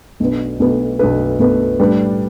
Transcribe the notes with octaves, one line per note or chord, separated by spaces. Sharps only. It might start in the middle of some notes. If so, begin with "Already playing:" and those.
B1 B2 A3 D4 B4
B1 B2 A3 D4 B4
B1 B2 A3 D4 B4
B1 B2 A3 D4 B4
A2 G3 D4 B4